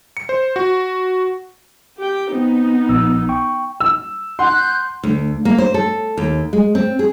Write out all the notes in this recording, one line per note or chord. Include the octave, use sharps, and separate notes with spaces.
C#7
C5
F#4
G4 G5
B3 C4 D#4
A#1 E6
G5 C#6
E6
F#5 C6 F#6 G6
D2
A#3
C5
A4
D#2
G#3
C4
G#4